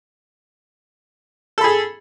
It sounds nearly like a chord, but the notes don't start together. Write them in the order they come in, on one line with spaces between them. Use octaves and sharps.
A4 B5 G#4